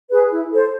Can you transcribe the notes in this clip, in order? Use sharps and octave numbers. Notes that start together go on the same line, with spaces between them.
G#4 B4
E4
A4 C5